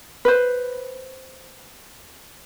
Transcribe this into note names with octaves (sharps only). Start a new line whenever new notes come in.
B4 C5